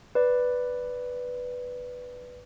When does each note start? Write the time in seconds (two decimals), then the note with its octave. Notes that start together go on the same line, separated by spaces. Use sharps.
0.15 B4 D5